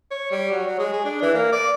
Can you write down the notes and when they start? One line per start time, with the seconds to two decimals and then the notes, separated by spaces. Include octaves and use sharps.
0.11 C#5
0.31 G3
0.51 F#3
0.66 F#3
0.79 G#3
0.93 G#4
1.05 D4
1.22 E3
1.34 A#3
1.52 D5